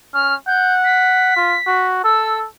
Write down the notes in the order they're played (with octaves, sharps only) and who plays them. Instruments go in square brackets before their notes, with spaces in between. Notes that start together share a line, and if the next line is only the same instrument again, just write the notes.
[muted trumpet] C#4 [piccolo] F6
[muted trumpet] F#5 [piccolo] G6
[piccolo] B6
[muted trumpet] F4
F#4
[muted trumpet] A4 [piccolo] E6